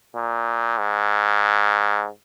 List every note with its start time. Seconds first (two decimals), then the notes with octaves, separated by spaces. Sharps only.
0.15 A#2
0.78 G#2